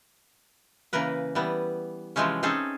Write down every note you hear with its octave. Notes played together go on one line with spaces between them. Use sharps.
C#3 E3 A#3 A#4 B4
E3 G3 B3
C3 E3 F3 G#3 C4 C#4
C4 C#4 D#4 G#4 A4